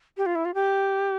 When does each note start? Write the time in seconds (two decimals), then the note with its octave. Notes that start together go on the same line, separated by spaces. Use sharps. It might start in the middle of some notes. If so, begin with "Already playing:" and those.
0.17 G4
0.26 F4
0.35 E4
0.45 F4
0.54 G4